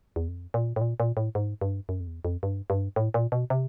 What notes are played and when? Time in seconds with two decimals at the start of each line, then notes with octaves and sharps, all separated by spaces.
0.16 E2
0.28 F2
0.54 A#2
0.76 A2
0.81 A#2
1.00 A#2
1.17 A2
1.35 G#2
1.61 G2
1.89 F#2
2.00 F2
2.07 E2
2.25 F2
2.43 G2
2.70 G2
2.96 A2
3.14 A#2
3.32 B2
3.50 C3